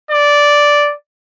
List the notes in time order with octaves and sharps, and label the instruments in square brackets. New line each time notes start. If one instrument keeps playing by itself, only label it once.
[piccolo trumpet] D5